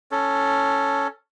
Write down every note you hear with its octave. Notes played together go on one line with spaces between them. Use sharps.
C#4 A4